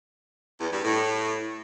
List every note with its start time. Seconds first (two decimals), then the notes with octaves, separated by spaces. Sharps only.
0.61 E2
0.72 G2
0.84 A2